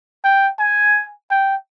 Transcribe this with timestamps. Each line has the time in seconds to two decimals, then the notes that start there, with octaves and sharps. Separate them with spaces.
0.24 G5
0.59 G#5
1.30 G5